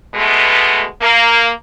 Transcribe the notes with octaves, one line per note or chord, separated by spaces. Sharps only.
B2 G#3 A3 B3
A#3